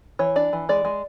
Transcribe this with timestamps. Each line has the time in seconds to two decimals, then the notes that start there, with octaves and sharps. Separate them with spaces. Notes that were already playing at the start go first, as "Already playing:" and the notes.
0.19 E3 C#5
0.36 D4 D5
0.53 E3
0.69 G#3 D5
0.85 G#3